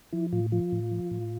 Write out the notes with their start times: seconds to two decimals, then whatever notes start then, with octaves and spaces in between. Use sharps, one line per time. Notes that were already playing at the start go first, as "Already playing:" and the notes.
0.13 F3 E4
0.32 A2 F4
0.52 F3 F4
0.72 A2
0.91 F3
1.11 A2